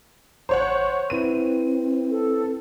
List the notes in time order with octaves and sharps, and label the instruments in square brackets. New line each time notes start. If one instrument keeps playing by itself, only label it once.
[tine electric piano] A1 [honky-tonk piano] C5 C#5 F#5
[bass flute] C4 [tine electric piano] E4 B4 C5 [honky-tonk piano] D#7
[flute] A4